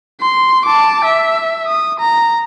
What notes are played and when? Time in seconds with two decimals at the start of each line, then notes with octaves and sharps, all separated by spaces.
0.21 C6
0.66 A5 D6
1.04 E5
1.67 D#6
2.00 A#5